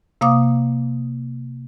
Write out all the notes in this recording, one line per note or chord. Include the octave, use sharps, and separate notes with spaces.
C3 A#3 F5 D6 D#6